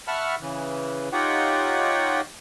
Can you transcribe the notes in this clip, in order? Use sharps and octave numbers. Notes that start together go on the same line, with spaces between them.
E5 F#5 A5 B5 C#6 F6
C#3 E3
D#4 F4 G4 C#5 F#5 G5